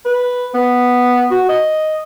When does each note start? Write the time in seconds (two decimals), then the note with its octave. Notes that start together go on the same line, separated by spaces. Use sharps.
0.05 B4
0.54 B3
1.31 F#4
1.49 D#5